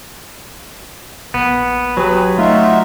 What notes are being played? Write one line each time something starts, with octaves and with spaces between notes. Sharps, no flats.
A#1 B3
F#3 G4 G#4 B4
A3 D#4 F4 F#4 E5